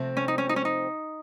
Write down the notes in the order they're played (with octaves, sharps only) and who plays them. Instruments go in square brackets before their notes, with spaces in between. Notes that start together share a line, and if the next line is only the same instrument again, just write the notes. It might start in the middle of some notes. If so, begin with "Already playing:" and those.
Already playing: [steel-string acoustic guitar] C3 F3 A3 C4
[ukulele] C#4
D#4
C#4
D#4
C#4
D#4